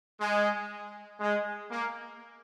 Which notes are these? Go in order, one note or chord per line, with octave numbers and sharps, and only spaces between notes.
G#3
G#3
A#3